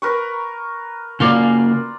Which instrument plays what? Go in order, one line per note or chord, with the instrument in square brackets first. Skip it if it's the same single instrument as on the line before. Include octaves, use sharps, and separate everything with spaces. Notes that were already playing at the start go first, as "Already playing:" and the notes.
[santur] A#4 B4 C#6
[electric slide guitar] C#3 A#3 [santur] F4 D5